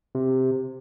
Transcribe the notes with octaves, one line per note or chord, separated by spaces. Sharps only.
C3